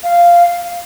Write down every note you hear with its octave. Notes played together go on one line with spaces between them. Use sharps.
F5